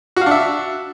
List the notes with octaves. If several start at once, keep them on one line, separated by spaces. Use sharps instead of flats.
D4 F#4 E5 F5